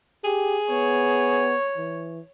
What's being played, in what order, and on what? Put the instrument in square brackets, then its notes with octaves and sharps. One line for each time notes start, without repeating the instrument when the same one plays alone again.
[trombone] G4 [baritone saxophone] G#4
[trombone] B3 [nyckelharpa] C#5
[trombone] E3